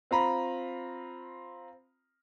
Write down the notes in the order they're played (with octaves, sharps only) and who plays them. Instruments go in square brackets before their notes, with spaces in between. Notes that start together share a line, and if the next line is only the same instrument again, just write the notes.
[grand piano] C4 F4 A#5 B5